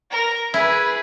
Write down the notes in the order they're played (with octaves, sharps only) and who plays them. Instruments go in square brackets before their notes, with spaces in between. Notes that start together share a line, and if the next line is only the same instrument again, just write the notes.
[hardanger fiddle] A#4
[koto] E4 [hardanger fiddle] G#4 B4